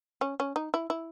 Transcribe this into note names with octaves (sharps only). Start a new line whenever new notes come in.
C#4
C#4
D#4
E4
E4